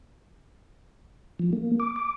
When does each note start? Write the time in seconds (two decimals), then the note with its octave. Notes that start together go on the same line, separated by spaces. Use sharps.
1.39 F3
1.53 A#3
1.80 D6
1.96 D6